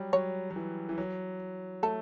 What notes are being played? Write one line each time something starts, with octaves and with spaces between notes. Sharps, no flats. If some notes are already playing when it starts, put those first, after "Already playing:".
Already playing: F#3 G3
F#3 C#5
F#3
E3
E3
F#3
A3 A4